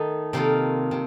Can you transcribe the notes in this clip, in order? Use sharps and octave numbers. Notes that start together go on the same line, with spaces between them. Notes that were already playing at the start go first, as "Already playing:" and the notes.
Already playing: D#3 A3 D#4 A4
C3 D#3 A#3 F4 A4
C3